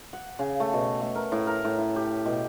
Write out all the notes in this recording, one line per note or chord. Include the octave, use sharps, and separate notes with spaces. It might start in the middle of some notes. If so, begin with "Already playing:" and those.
F#5
C#3
A3
B2
A3
A#4
A2
A#4
A2
E4
G4
B2